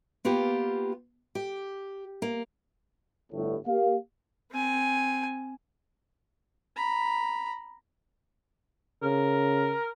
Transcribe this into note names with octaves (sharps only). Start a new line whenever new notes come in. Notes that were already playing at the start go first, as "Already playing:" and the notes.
A#3 B3 F4 G4
G4
A#3
G1 A2
A#3 G4 F5
C4 G#5
A#5 B5
C#3 A#4